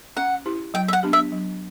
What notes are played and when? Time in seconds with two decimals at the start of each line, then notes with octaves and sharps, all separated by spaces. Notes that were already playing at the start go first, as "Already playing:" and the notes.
0.17 C#4 F#5
0.46 E4 G4
0.74 F#3 G5
0.88 E5
0.93 F#5
1.03 B3 D4 G4
1.13 E5
1.32 F#3